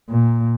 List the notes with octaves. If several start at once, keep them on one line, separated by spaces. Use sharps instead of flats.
A#2